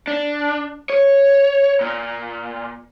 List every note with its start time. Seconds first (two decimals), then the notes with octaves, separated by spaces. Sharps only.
0.07 D4
0.90 C#5
1.81 A#2